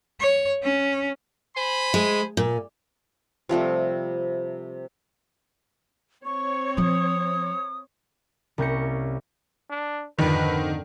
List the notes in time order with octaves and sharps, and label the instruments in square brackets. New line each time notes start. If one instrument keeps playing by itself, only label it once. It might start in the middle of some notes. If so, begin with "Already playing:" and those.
[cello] C#5
C#4
[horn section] C5 G#5 B5
[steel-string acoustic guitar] G#3
A#2
[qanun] C3 F3 G3 A3
[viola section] C4 C#5 [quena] C#6
[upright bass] F3 F4 [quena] D#6
[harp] C2 A#3 C#4 G6 A#6 C#7
[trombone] D4
[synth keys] F2 G#2 D3 [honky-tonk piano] D#3 [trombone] B4